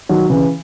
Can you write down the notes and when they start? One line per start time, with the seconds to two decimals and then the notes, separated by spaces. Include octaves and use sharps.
0.09 D#3 F#3
0.30 C#3 E3